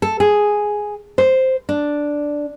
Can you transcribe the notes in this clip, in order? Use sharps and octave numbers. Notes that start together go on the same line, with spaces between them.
A4
G#4
C5
D4